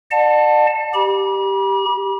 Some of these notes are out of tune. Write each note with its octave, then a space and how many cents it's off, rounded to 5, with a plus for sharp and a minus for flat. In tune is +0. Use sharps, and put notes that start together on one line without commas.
D5 +40 F#5 -35 A5 +5
G4 +0 B5 -40